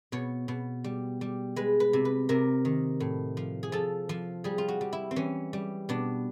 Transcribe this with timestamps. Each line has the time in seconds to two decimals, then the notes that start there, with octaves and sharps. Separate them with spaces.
0.12 B2 C#5
0.48 B2
0.84 G3
1.21 G3
1.56 G#3 B4
1.80 B4
1.93 C3
2.05 B4
2.29 C3 A#4
2.65 D#3
3.00 A2
3.37 F3
3.63 G#4
3.72 F3 A4
4.09 F3
4.44 G3 G#4
4.58 F4
4.68 F#4
4.81 G3
4.93 E4
5.11 C4
5.16 E3 C#4
5.53 G3
5.89 B2 D4